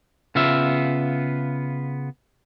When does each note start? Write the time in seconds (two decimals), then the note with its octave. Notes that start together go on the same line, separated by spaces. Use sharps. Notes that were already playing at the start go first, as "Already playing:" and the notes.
0.35 C#3 B3 F4 E5